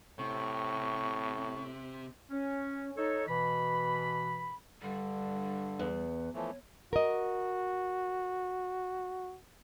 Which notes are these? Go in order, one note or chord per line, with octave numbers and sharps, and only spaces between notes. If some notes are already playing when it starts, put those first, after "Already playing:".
A2 C3 C#6
C#4
D#4 A4 C#5
B2 E3 B5
G2 D3 G3
E2
E3 F3 A3 C#5
F#4 A#4 D#5